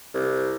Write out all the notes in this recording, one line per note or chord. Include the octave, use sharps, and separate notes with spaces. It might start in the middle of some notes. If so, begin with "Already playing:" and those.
C2